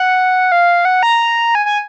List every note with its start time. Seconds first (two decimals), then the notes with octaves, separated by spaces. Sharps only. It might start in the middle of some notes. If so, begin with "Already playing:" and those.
Already playing: F#5
0.52 F5
0.85 F#5
1.03 A#5
1.55 G#5
1.66 G#5